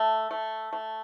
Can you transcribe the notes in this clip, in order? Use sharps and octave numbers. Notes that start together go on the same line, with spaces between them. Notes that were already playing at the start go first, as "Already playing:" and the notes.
Already playing: A3 A5
A3
A3